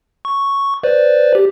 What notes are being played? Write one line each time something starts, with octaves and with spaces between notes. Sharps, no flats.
C#6
B4 C5 D5
G4